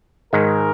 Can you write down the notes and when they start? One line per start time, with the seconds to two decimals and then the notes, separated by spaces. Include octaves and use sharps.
0.33 G#2 D#3 G#3 A#4